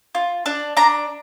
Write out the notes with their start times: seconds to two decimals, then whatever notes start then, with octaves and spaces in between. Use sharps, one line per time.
0.15 F4
0.46 D4
0.77 D4 A#5